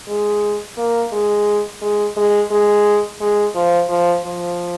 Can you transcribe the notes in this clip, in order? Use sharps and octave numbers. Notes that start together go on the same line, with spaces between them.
G#3
A#3
G#3
G#3
G#3
G#3
G#3
F3
F3
F3